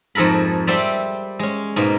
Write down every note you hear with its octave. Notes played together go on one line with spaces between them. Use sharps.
F2 G#2 A4 A#4 B5
G3 C4 D5 E5 G5
G#3 C#4
G#2 B2 G#3 A#3